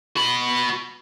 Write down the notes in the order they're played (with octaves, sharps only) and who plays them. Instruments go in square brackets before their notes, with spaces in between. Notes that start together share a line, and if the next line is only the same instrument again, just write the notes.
[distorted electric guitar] F#4 B5